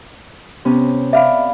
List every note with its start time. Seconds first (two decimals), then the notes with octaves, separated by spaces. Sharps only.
0.65 C3 B3 C#4
1.13 D5 E5 F5 B5